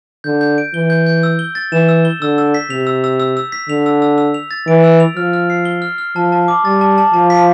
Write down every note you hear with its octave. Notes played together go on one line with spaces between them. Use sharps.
D3 G6
G6
D7
E3 G7
G6
G6
E6
G7
A6
E3 E7
E6
G7
D3 E6
E6
B6
C3 F7
E6
E6
E6
E6
B6
D3 F7
E6
E6
E6
F7
A6
E3 D7
E6
F7
F3 F6
F6
C7
G7
F6
F6
F3 A5
A5
D6
G3 A6
A5
A5
F3 A5
B6